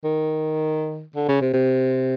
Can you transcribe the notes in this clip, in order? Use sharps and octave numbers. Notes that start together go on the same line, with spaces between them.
D#3
D3
C#3
C3
C3